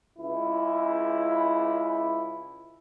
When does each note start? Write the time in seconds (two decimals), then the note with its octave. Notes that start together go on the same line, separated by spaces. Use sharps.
0.18 C#2 E4